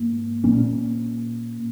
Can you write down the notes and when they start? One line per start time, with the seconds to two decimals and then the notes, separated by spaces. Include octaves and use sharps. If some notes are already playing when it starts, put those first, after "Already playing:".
Already playing: G#2 A#3
0.44 A#2 A#3 C#4